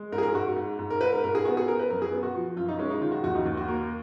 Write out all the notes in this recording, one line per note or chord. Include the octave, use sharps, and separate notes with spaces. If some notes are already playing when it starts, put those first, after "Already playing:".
Already playing: G#3
G#2 A#4
G#4
A#4
G#2 F#4
G#2
G#2
A#4
G#2 B4
A#4
G#2 A#4
G#4
B3 F#4
G#4
B3 A#4
B4
F#2 A#4
G#4
B3
F#4
F3
F#2 F4
D#4
G#3 C#4
D#4
D#3 F4
F#4
D#2 F#4
D#4
D#2
F#4
A#3 A#4